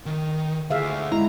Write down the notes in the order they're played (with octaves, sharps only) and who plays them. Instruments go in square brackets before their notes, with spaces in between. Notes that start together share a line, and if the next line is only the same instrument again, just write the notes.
[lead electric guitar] D#3
[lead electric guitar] D2 [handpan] G#4 E5 F5
[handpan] G#3 E4 [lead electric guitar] A#5